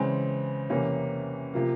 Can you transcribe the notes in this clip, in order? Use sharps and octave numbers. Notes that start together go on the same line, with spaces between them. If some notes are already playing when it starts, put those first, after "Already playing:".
Already playing: C#3 E3 G#3 C4
E2 C3 E3 A#3 C#4
C3 F3 A#3